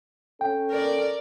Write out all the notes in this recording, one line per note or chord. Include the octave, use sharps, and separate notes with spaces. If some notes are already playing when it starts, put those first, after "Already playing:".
C#4 A4 G5
A#4 D5